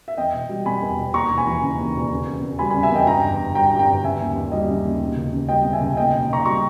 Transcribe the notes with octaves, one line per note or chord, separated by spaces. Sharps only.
E5
E2 D#5 G5
E1
G3
B2 G#5 B5
E2
E1
D#2 A#5 C#6
E1
G#5 B5
E3
C#3
D#2
E1
C#3
E2
E2
G3 G#5 B5
C#3 G#5 B5
E5 G#5
E2 D#5 G5
G2 G5 A#5
G1
G1
G3 G5 A#5
G2
G5 A#5
G1
C#3 E5 G#5
D#2
D#2
G3 D#5
C#3
D#2
B2
C#2
C#2
G3 D#5 G5
B2
E5 G#5
C#2
A#2 D#5 G5
D#5
B1
D#5
B1 A#5 C#6
G3 A#5 C#6